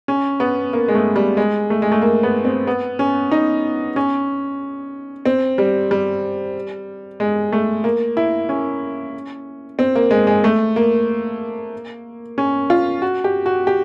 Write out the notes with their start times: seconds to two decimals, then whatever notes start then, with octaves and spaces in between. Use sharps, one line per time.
0.08 C#4
0.40 B3
0.73 A#3
0.88 G#3
0.95 A3
1.16 G3
1.37 G#3
1.70 A3
1.82 G#3
1.92 A3
2.02 A#3
2.23 B3
2.45 C4
2.67 B3
2.99 C#4
3.31 D#4
3.96 C#4
5.25 C4
5.58 G3
5.91 G3
7.20 G#3
7.52 A3
7.84 A#3
8.17 E4
8.49 C#4
9.79 C4
9.95 A#3
10.11 G#3
10.27 G#3
10.44 A3
10.76 A#3
12.38 C#4
12.70 F4
13.02 F#4
13.24 G4
13.46 F#4
13.67 G4